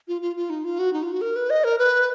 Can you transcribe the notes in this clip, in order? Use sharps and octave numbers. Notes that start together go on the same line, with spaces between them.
F4
F4
F4
D#4
F4
F#4
D#4
F4
F#4
A#4
B4
D#5
A#4
B4